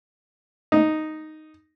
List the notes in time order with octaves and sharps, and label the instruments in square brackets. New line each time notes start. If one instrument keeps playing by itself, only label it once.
[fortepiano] D#4